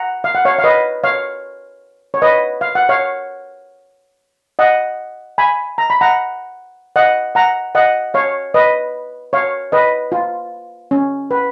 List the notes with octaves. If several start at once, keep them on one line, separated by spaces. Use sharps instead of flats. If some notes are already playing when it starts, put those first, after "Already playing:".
Already playing: F#5 A#5
F5
F#5
C#5 F5
F5
B4 D#5
C#5 F5
C#5
B4 D#5
F5
F#5
C#5 F5
D#5 F#5
G#5 B5
A#5
B5
F#5 A#5
D#5 F#5
F#5 A#5
D#5 F#5
C#5 F5
B4 D#5
C#5 F5
B4 D#5
F4
C#4
B4